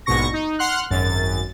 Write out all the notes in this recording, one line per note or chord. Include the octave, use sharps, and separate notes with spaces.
A#1 G#2 B2 C#6 A#6
D#4
F#5 C6 F6 F#6
G#1 F#2 A6